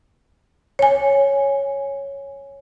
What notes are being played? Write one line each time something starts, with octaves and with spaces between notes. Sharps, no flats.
C#5 G#5